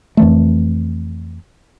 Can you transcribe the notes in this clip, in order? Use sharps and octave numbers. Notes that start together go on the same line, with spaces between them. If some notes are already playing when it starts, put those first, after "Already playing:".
F2 E3 A3